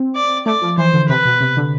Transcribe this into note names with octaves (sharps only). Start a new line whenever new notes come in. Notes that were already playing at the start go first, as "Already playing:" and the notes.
Already playing: C4
D5
A3 D5
F3
E3 C5
D3
C3 B4
B2
C3
D3